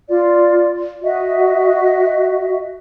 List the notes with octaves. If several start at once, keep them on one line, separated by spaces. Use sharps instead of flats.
F4 D5
F#4 D#5 E5